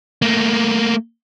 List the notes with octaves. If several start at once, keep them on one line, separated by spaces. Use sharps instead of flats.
A3 A#3